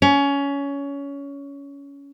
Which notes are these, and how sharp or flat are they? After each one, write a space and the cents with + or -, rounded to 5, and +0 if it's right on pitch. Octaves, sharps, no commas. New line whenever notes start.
C#4 +20